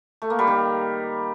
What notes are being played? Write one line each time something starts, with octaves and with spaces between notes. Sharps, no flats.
A3
A#3
G3
D#3